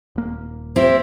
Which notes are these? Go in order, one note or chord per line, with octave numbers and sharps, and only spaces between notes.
D#1 A#3
C4 E4 G4 C5